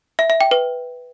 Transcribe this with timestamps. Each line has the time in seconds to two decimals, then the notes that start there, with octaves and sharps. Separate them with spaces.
0.19 E5
0.30 E5
0.41 G5
0.51 B4